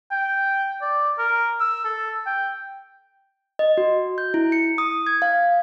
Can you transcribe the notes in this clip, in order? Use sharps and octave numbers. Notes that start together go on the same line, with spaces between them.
G5
D5
A#4
E6
A4
G5
D#5
F#4
G6
E4
C#7
D#6
G#6
F5